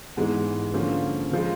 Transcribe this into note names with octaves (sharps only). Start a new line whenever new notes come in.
G#2 E3 G#3 B3
D3 F3 A#3 C#4
C#3 F3 G#3